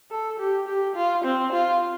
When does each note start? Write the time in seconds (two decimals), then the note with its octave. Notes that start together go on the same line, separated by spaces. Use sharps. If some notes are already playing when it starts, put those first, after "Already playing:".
0.11 A4
0.39 G4
0.67 G4
0.96 F4
1.25 C4
1.52 F4